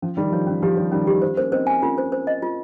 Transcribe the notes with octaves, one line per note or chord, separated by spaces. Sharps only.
F3 C#4
D#3 G3 G4
F3 C#5
D#3 C#4
F3 G4
D#3 G3 C#5
D#3 G3 C#4
F3 G4
F3 C5
A#3 C#4 C5
C4 D#4 C5
G#5
A#3 C#4 F4
C5
C5
D#5
F4